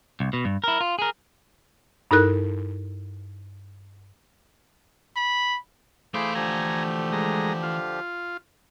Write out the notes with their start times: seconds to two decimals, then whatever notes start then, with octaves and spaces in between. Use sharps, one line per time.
0.20 C2
0.33 B2
0.45 G2
0.64 E4 A#4
0.81 F4
0.99 G#4 A#4
2.11 G2 D#4 E4 A4 A#4 F#6
5.17 B5
6.14 E3 A3 E4 G#4 C5 F5 B5 D6
6.35 D3 F3 G4 G#5 A#5
7.13 G#3 A#5
7.63 F4